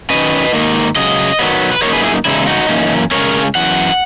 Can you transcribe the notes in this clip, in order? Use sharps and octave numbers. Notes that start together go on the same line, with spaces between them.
D#3 F#3 C#4 B4 D#5
G#2 D#3 A#3 D#4
F#2 C#3 F#3 D#5
D#3 F#3 B3
B4
F#2 D#3 A#3 D#4 A#4 C#5
G#4 B4
E4 G#4
E2 C#3 G#3 D#4 E4
D#4 F#4
F#2 E3 A#3 C#4
C#3 G#3 C#4 A#4 C#5
F#2 E3 F#5